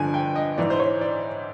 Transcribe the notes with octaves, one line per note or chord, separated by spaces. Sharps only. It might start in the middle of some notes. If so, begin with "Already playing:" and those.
Already playing: G2 D3 F3 G#5
G5
D#5
G#2 E3 D5
C5
C#5
D5